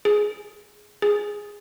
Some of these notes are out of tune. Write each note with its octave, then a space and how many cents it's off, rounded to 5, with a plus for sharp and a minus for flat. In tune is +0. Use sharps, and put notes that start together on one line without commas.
G#4 +10
G#4 -5